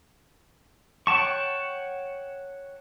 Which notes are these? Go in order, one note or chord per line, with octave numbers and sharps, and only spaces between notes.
C#5 F#5 G5 A5 C#6